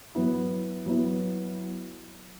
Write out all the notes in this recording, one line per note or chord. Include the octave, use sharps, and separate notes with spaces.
F#3 B3 E4
F#3 B3 E4